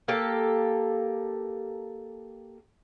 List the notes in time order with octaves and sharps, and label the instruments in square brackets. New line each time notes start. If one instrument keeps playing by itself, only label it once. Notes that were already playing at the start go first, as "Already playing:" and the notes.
[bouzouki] A#3 G4 A4